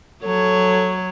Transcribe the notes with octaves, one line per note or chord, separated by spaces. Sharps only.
F#3 A4 C#5